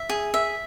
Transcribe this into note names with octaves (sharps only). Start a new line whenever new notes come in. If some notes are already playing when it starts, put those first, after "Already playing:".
Already playing: E5
G#4
E5